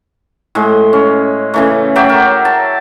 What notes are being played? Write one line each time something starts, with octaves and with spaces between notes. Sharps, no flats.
A2 G#3
C#4
C#3 E3 A3
F#3 D5 E5 G5
A#4
A5